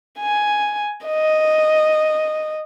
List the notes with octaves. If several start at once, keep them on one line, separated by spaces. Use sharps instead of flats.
G#5
D#5